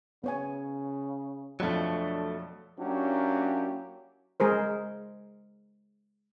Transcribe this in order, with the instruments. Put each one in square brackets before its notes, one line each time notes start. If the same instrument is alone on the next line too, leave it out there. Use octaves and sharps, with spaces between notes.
[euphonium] C#3 [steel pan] B3 C#5 G#5
[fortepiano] F2 B2 F3 [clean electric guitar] F#3 A3 [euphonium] D4
[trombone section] F#3 A#3 C#4 D4 E4 G4
[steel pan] G#3 G#4 A#4 C5